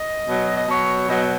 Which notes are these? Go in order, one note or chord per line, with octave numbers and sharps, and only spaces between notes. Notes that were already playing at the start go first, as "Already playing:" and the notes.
Already playing: D#5
B2 F#3
D#5
B2 F#3 C#5
B2 F#3 D#5